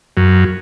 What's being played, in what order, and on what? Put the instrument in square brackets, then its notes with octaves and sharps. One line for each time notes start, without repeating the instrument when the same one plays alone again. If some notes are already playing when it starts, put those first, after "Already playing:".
[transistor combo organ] F#2